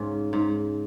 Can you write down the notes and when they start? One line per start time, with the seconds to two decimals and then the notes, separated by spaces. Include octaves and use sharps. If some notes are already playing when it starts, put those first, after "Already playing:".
Already playing: G#2 C#3
0.33 G#2